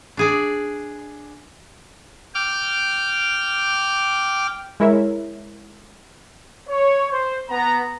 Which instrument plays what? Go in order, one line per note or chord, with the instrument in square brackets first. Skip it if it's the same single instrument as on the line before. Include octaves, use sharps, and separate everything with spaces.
[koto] D4 G#4 D5
[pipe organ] G5 D6 F6
[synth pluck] G#3 E4 A#4 C#5 E5
[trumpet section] C#5
C5
B3 A#5